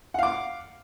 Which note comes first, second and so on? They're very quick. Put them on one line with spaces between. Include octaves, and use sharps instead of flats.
F#5 F5 D6